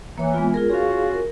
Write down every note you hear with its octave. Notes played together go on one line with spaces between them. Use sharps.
E3 A#3 C#5
G#3 B3 F4
F4 G#4 A#4
C#4 F4 F#4 G#4 F5
A#4